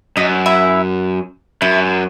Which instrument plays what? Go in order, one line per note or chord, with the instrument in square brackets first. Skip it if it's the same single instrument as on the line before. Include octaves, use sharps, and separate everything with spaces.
[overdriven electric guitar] F#2 [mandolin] D#4 D#5
[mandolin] E4 E5
[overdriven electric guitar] F#2 [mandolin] E4 E5